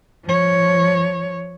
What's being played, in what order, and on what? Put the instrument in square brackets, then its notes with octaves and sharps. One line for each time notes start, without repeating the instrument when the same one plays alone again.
[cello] F3 C#5